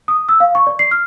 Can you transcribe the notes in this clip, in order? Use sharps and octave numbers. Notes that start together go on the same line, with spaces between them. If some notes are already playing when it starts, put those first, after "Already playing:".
D#6
E6
F5
C#6
D5
C7
F6